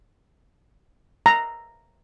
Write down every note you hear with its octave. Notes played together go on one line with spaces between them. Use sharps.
A#5